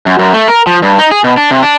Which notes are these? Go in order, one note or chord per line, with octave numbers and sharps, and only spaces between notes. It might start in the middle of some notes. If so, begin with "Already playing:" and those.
F#2
F#2
A3
A#4
F3
G2
D#4
G#4
B2
D4
C3
D4